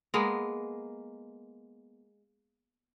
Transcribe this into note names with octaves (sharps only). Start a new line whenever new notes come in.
G#3 A#3 B3